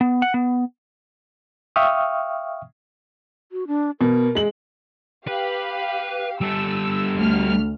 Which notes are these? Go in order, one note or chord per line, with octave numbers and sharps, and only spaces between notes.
B3
F#5
B3
E5 F5 G5 C#6 D#6 F6
F#4
D4
B2 A#4
G#3 F#7
G4 B4 F5
G3 A4 E6
D2 F6